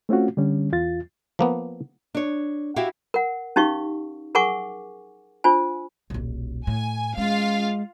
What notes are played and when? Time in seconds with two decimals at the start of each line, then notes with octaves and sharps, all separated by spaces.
0.09 A3 C4 C#4 F4 F#4
0.37 D3 G3 C#4
0.72 E2 F4 A6
1.39 F3 A#3 B3
2.15 D4 C#5
2.76 E4 F#4 G4 E5 F5 G5
3.14 A#4 F#5
3.56 C#4 D#4 G4 F5 C#6
4.35 G#4 A#4 F#5 G#5 C#6 D6
5.44 D4 F4 C5 G#5
6.10 D#1 B1
6.67 A2 G#5
7.18 G#3 C#4 F4 F5